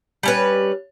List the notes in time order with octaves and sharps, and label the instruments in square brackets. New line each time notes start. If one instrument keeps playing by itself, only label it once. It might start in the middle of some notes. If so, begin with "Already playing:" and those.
[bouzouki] G3 C#4 B4